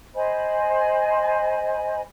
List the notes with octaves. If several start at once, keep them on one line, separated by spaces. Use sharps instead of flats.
C5 D#5 G#5 B5